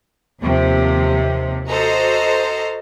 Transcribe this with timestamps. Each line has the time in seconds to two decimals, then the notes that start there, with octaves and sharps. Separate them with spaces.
0.40 D#2 C3 F3
1.67 F#4 A4 C5 D#5 A#5